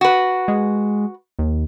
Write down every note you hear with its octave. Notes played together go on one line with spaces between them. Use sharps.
F#4 B4
G#3
D#2